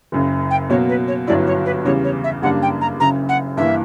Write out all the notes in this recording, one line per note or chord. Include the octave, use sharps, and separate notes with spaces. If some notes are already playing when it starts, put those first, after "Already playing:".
F#1 F#2 C#3
G5
B2 F#3 A#3 C#5
B4
C#5
G1 G2 F#3 C#4 E4 D5
C#5
B4
E2 C#3 G3 C#5
C#5
E5
F#2 C#3 G3 A#3 D4 F#5
G5
A#5
F#1 F#2 C#3 A#5
F#5
G2 E3 A#3 E5